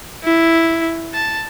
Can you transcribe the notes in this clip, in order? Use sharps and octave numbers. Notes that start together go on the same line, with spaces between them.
E4
A5